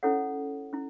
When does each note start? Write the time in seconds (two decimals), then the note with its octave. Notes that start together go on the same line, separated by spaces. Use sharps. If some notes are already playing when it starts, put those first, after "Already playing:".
0.03 C#4 E4 A4 C#5 F#5
0.73 C#4 E4